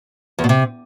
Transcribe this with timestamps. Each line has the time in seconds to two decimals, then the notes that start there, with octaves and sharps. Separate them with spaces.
0.39 E2
0.44 B2
0.49 C3